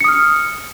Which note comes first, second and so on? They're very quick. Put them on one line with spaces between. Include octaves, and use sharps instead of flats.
C#7 D#6 F6